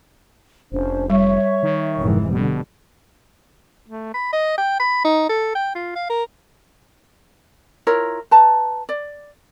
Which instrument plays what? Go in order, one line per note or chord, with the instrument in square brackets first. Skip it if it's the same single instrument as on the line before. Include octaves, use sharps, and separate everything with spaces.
[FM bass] F1 [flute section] C#4 D4 C5
[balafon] G3 [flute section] C#5 E5 C#6
[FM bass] D#3
[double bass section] F1 G#2 E3
[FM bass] B2 [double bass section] D3 G3
[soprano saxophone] A3
B5
D#5
G5
B5
D#4
A4
G5
F4
F5
A#4
[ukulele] E4 F4 A#4 C#5
B4 A5 A#5
D5